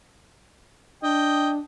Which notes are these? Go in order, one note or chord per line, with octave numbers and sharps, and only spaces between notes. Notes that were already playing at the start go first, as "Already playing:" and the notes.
D4 D#5 G5